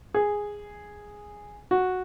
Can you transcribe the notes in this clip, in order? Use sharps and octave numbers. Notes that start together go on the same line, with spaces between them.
G#4
F#4